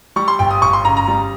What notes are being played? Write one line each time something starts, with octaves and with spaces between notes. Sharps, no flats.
G3 C#6
C6
G1 G5
D#6
G1 C#6
C6
C#3 A#5
A#5
G3